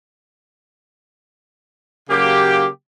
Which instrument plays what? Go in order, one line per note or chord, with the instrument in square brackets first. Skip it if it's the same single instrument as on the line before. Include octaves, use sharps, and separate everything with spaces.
[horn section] C#3 F#3 A#3 G4